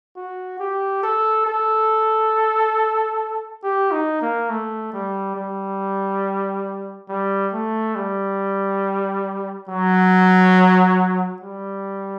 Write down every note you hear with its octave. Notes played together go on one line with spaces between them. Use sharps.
F#4
G4
A4
A4
G4
D#4
A#3
A3
G3
G3
G3
A3
G3
F#3
G3